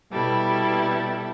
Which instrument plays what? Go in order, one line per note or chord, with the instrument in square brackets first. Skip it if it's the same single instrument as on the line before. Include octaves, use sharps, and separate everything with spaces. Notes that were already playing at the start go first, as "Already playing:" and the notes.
[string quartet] B2 G3 E4 A4